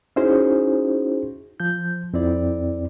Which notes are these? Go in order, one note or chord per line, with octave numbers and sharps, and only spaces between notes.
C#4 D#4 E4 F#4 G#4 C5
F3 G6
F2 C4 E4 D5